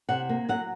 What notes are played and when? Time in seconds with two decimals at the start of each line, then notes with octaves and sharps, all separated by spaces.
0.09 C3 F#5
0.29 A#3
0.49 F#3 F#5